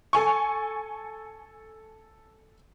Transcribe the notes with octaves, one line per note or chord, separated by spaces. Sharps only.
A4 G#5 C#6